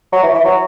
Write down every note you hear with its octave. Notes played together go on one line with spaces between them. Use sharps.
F#3
E3
E3
F#3